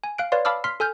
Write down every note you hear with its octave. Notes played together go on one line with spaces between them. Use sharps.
G#5
F5 F#6 D7
B4 C#5 D5 F5 C6
F5 A5 B5 D6 E6 F6
C6 F6 B6 C7
A4 G#5 F6 G6